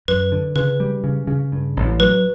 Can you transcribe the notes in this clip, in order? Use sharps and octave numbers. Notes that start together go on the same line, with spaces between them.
F#2 B4
D3
C#3 B4
G3
C#3
C#3
G2
A1
F#3 B4